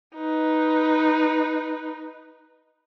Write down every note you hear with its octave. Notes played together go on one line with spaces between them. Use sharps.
D#4 B4